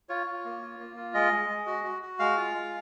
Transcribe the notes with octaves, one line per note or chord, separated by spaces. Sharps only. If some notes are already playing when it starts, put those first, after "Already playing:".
F4 C#5
F4
A#3
F4
A#3
F4
G#3 D#5
G#3
G#3
F#4
F#4
F#4
G#3 F5
F4
G#3